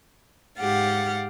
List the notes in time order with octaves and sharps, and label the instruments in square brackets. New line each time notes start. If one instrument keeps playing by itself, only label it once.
[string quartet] G#2 G4 F5 F#5 A6